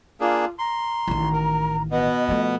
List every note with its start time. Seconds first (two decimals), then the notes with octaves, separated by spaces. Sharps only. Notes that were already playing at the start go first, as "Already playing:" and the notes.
0.21 A#3 D4 F4 G#4
0.59 A#5 C6
1.08 A1 D#3
1.33 A#4
1.91 B2 B3 D#5
2.28 F3 A3